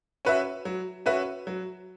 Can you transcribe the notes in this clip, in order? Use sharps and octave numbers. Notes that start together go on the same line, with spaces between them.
C#4 F#4 B4 E5
F#3
C#4 F#4 B4 E5
F#3